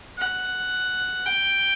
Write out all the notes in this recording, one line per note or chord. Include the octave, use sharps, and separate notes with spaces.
F#5
G5